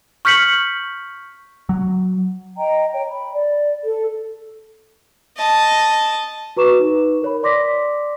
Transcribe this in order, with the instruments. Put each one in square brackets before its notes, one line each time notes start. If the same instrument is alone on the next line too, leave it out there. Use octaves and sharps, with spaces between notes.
[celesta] C#6 F6 G6 B6 C#7 F#7
[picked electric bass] F#3
[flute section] D#5 G5 A#5
C#5 G5
B5
D5
A4
[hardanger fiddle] D#5 A5
[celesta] F#4 B4 A#5 C#6 D6 E7
D#4 B4
A#4 C#5 B5
D5 C6 D6 A#6 B6